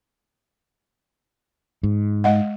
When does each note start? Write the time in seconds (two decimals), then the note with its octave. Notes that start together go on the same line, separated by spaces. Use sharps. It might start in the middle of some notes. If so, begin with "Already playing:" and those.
1.83 G#2
2.24 G#3 D#5 F#5